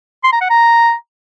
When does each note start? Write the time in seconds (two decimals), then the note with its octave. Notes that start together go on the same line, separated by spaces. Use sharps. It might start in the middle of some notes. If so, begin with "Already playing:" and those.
0.24 C6
0.32 A#5
0.41 F#5
0.50 A#5